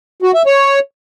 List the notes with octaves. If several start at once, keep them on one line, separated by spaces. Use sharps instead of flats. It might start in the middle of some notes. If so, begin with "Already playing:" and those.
F#4
E5
C#5